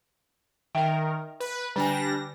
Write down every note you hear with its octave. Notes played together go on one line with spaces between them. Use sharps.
D#3 A#4 E5 G5
B4
D3 G3 D4 G#5 A#6